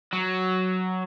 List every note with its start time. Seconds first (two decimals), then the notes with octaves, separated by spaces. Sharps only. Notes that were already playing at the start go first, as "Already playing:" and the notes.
0.13 F#3